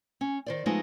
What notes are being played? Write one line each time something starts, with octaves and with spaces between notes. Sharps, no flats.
C#4
D#3 C5 D5
F3 G#3 A3 B3 D#4 F4